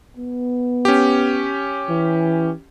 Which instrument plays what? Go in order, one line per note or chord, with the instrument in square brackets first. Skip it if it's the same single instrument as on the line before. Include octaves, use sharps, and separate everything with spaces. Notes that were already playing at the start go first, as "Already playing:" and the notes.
[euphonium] B3
[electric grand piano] C#4 G4
[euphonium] E3